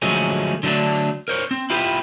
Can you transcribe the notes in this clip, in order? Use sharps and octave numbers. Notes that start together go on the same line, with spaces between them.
D2 F3 F#3 G#3 A3 C#4
D3 F#3 G#3 A3 D4
A#4 C5 C#5
C4
E4 F4 G4 B4